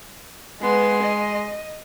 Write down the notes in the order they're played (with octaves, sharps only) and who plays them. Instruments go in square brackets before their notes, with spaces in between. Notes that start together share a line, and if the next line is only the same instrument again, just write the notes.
[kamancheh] G#3 C6 [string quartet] B3
[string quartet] D#5